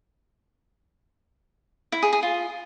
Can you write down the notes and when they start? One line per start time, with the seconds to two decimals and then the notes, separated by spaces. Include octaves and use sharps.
1.92 E4
2.02 G#4
2.13 G#4
2.23 F4